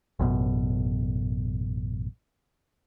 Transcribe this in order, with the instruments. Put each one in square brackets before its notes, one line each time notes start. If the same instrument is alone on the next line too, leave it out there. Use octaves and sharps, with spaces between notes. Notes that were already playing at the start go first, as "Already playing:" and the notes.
[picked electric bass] A1 F#2 B2